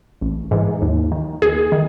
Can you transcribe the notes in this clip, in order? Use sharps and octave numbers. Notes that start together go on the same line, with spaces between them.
A1
G#2 E3
D#2
D#3
D#2 G#4
D#3